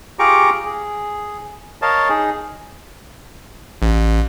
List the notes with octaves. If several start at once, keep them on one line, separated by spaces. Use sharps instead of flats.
F4 G4 G#4 A#5 C#6 D6
G#4
A#4 C#5 D#5 F5 A5
D#4 G#4
A1